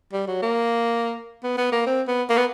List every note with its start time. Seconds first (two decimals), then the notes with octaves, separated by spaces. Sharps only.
0.13 G3
0.27 F#3
0.42 A#3
1.43 B3
1.57 B3
1.72 A#3
1.86 C4
2.07 B3
2.29 A#3
2.37 B3